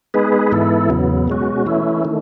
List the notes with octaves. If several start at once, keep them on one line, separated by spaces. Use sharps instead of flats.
G#3 B3 D#4 G#4 B4
G#2 E3 B3 E4 A4
E2 C#3 F#3 B3
B2 G#3 C#4 F#4
E3 A3 C#4 E4
D#3 A3